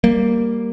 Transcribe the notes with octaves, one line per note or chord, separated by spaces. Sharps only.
G3 A#3